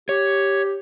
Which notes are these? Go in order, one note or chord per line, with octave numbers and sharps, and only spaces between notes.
G4 C#5